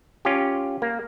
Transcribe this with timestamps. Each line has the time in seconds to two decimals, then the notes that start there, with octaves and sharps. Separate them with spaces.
0.25 C#4 F4 G4
0.82 A#3